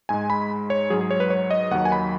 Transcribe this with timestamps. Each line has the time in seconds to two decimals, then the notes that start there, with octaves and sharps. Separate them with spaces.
0.09 G#2 G#3 G#5
0.30 B5
0.70 C#5
0.90 G#2 F#3 G#4
1.01 G#4
1.11 C#5
1.20 B4
1.30 C#5
1.51 D#5
1.71 D#2 D#3 F#3 F#5
1.85 G#5
1.92 B5